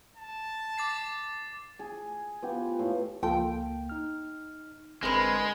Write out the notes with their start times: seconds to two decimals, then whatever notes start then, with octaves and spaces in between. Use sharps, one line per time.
0.16 A5
0.78 D6 A6 C7
1.79 G#4
2.42 B3 F4 G4
2.79 A2 F5
3.23 C#2 F3 A#3 F4 A4 G5
3.89 D#4 F6
5.03 G1 G#3 C4 D4 A#4 B4